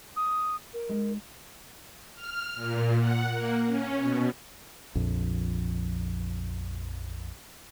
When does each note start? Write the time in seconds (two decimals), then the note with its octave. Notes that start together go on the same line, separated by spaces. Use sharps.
0.16 D#6
0.73 A#4
0.89 G#3 D#4
2.15 F6
2.55 A#2
2.99 F#5
3.31 A#3
3.67 C#4
3.98 B2
4.95 A#1 F2